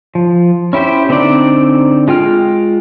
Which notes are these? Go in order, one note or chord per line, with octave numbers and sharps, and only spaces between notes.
F3
C#4 E4 G4 C5
D3 C4 D4 D#4 D5
G#3 F4 G5 F6